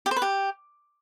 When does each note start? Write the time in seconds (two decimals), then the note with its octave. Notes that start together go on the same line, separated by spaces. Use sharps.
0.06 G4
0.11 C5
0.16 B4
0.22 G4